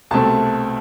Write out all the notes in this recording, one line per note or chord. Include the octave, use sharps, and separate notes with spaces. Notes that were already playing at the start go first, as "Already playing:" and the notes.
C2 B2 A3 C4 A5